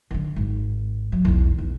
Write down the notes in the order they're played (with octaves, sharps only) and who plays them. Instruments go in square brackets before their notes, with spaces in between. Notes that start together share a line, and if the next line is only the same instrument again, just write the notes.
[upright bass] D3 E3
G#1
F#3
B1 E2
B1 E2